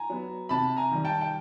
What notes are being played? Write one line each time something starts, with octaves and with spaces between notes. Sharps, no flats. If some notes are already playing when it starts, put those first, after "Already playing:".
Already playing: G#5 A#5
F#3 B3
C3 A5 B5
G#5 A#5
D#3 G3
G5 A5
G5